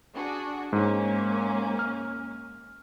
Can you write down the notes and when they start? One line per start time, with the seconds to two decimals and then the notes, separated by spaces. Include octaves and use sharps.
0.15 D4 F#4 G#4
0.73 G#2 G#3 A#3 C#4
1.79 F6